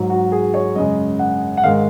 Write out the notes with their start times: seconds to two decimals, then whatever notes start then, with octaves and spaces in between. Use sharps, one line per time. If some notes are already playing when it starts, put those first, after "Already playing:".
Already playing: G#2 F#3
0.10 F#4
0.32 G#4
0.54 C#5
0.75 F#2 C#3 G#3 D#5
1.19 F#5
1.57 F#5
1.63 G#2 D#3 G#3 F5